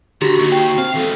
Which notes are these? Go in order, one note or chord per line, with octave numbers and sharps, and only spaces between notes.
D3 F#4 G4 A#5 B5
D#2 C#6
G5
C4 F5
E3 G#3 A4